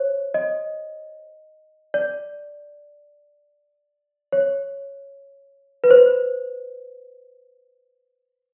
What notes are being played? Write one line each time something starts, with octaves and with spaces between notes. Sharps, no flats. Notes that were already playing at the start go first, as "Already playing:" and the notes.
Already playing: C5 C#5
D#5
D5
C#5
B4
C5